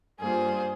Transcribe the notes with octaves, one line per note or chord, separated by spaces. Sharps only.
G2 G3 A#3 F4 G#4 C5